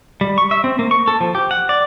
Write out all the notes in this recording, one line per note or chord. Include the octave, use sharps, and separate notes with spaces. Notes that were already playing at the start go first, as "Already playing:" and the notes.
G3
C#6
E5
C4
A#3
C#6
A4
F3
G4
F#5
D5